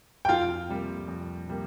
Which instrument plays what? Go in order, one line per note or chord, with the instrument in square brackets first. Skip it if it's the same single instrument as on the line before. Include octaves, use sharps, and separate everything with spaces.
[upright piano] G5
[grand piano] F2 [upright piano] F4 F5
[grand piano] C3 G3 A#3
F2
C3 G3 A#3